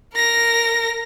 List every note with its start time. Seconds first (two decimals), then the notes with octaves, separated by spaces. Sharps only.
0.14 A#4 A#6